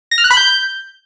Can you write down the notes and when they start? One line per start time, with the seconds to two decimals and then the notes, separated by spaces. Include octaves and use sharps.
0.11 A#6
0.18 F6
0.24 F#6
0.31 B5
0.37 G6